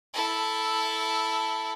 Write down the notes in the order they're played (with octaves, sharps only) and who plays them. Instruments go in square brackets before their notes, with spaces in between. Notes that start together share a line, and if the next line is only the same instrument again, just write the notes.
[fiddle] E4 A4